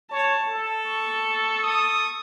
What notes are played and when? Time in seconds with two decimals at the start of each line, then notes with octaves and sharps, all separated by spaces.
0.11 C#5 A5
0.48 A4
0.87 C#6
1.63 D#6